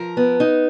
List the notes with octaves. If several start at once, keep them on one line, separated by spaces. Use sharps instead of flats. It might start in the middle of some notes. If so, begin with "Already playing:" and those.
Already playing: F3 A#4
B3
D#4